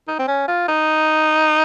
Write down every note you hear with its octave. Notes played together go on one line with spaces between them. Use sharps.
D#4
C4
C#4
F4
D#4